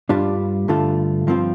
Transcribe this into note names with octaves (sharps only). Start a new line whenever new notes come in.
G2 G3 D4 F4
G2 D3 A3 F4
G2 F3 C4 F4